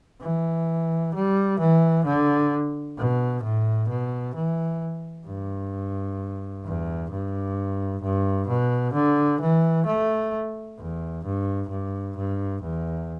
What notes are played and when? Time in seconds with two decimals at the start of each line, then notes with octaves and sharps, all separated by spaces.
0.21 E3
1.14 G3
1.59 E3
2.05 D3
2.98 B2
3.43 A2
3.89 B2
4.35 E3
5.27 G2
6.65 E2
7.11 G2
8.03 G2
8.48 B2
8.94 D3
9.41 E3
9.86 A3
10.78 E2
11.25 G2
11.69 G2
12.17 G2
12.62 E2